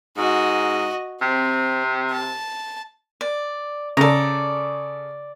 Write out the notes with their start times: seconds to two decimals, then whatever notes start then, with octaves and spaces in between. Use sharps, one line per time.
0.17 G#2 F#4 D#5
1.21 C3 C4
2.12 A5
3.21 D5
3.97 C#3 A4 D5 A#5